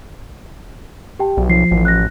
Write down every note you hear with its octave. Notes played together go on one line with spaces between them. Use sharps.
G4 G5 A5
B1
F3 C7
A1
F#6 A#6